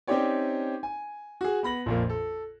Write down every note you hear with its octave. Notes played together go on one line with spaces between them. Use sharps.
C4 C#4 D#4 G4 C#5 D5
G#5
F#4 G#4
B3 B5 A#6 F#7
A#1 F2 A#3
A4